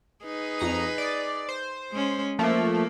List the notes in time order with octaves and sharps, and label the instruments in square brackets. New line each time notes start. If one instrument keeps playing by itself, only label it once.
[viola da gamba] D#4 G#4 B4
[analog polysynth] F2 A#5 C#7
D5
C5
[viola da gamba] G#3 C#4
[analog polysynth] F3 A3 [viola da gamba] A#3